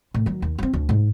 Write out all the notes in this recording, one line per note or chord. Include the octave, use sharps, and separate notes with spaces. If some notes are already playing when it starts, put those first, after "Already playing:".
A2
D#3 F#3
D#2
G#3 C4
D2
G#2